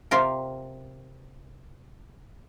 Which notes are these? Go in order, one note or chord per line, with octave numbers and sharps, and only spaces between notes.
C3 F4 G4 A#4